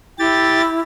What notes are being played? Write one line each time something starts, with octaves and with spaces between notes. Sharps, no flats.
E4 G4 A6